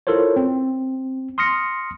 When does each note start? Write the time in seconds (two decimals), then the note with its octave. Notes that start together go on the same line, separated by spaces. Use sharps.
0.07 E4 F4 A4 A#4 C5 C#5
0.36 C4
1.38 C6 D#6 F6 A#6 C#7